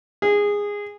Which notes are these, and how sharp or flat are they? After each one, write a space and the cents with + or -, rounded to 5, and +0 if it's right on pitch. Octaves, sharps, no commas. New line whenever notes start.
G#4 -15